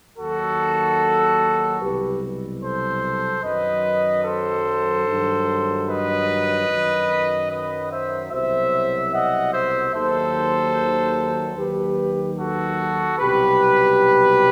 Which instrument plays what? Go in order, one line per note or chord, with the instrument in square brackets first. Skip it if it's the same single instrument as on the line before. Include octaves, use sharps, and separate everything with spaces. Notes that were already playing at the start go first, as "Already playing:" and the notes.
[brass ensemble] D#2 D#3 F#3 F#4 A4
C2 B2 F#3 G4 B4
A4 C5
F#2 D#3 F#3 B4 D#5
A4 C5
G2 D#3 F#3
B4 D#5
F#2 D#3 F#3
B4 D#5
C5 E5
C2 B2 F#3 C5 E5
D#5 F#5
C5 E5
D#2 D#3 F#3 A4 C5
D#2 D#3 F#3 G4 B4
F#4 A4
C2 B2 F#3 G4 B4